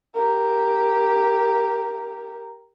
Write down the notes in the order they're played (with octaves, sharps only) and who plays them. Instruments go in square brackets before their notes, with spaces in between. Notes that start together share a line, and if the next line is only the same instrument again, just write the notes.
[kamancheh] G4 A#4